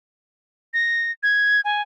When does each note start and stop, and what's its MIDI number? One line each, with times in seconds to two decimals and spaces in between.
0.74 1.11 94
1.23 1.61 92
1.65 1.82 80